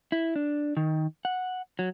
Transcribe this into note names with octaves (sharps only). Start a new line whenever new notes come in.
E4
D4
D#3
F#5
F#3